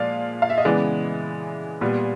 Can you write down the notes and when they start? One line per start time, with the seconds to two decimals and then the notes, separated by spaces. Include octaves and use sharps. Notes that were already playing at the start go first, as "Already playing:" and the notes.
Already playing: A#2 F3 G#3 D5 F5
0.42 F5
0.50 E5
0.58 D#5
0.65 C#3 E3 G#3 B3 D5
1.81 A#2 G3 B3